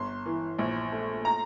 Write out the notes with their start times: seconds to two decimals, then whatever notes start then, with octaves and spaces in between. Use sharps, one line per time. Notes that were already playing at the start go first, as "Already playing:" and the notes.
Already playing: G1 C6
0.26 E3
0.59 A#1
0.92 A3
1.25 A#5